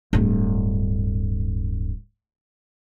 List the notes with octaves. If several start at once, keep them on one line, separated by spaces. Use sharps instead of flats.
D1 G2